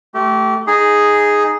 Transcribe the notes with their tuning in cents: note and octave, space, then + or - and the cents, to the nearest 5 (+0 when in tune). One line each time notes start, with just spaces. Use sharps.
A3 +0 G4 -30
D#4 +0 G#4 +0